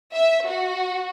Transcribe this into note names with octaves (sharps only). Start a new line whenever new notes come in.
E5
F#4